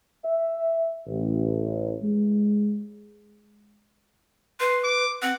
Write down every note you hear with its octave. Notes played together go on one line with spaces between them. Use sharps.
E5
A1
G#3
B4 C6
D6
C4 F#5